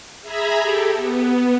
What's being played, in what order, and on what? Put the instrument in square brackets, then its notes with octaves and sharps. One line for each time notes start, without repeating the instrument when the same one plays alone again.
[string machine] G#4 E5 G#5 A#5 B5
G4 A4
B3